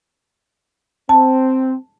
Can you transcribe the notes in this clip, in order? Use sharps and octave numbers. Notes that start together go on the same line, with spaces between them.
C4 A5